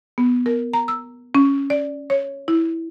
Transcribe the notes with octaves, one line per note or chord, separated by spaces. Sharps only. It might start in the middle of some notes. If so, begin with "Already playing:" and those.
B3
A#4
A#5
E6
C#4
D5
C#5
E4